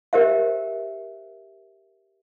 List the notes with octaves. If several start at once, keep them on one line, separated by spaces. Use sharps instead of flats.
G4 A#4 C5 E5 F5